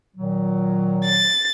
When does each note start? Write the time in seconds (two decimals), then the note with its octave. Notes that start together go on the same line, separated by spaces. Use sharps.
0.16 A#2 D#3 F#3
1.04 A6